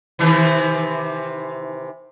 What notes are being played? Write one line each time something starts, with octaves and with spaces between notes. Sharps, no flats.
C3 D#3 E3